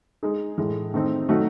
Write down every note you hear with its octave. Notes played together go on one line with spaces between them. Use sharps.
G#3 D#4 G#4
A2 E3 G#3
D#3 A3 C4 D#4
D#3 F#3 A3 D#4 F#4